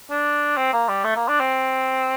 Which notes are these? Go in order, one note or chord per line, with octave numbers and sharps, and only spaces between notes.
D4
C4
A#3
G3
A3
A#3
D4
C4